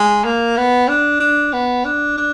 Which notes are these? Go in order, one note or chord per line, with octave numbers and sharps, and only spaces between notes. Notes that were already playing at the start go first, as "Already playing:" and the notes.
Already playing: G#3
A#3
B3
D4
D4
B3
D4
D4